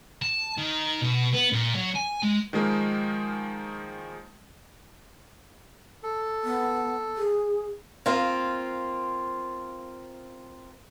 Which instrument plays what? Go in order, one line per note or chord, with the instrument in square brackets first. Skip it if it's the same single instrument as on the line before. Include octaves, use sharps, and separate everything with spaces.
[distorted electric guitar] A5
D#3
B2
B3
A#2
F#3
G#5
G#3
[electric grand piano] D#3 F3 G#3 A#3
[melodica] A4
[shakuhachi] B3
G#4
[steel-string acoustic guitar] A#3 C4 F4